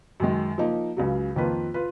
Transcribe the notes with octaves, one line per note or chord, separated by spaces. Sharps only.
F#2 D#3 G#3
F3 A#3 D#4
C#2 C#3 F#3
F2 D#3 A#3 F4 B4
F4 B4